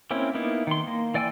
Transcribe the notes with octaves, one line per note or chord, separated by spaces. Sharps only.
A#3 C4 C#4 E4
A#3 B3 D#4 E4
D#3 C6
A#3
E3 D5 G5 G#5 E6